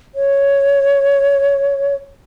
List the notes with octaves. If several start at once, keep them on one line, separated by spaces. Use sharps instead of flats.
C#5